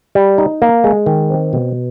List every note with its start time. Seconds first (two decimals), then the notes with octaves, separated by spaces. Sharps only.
0.15 G3
0.38 D#4
0.62 A#3
0.84 G#3
1.06 D#3
1.30 C4
1.53 B2